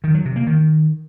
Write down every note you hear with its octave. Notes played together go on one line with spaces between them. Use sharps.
D#3
F#3
C3
A#3
D#3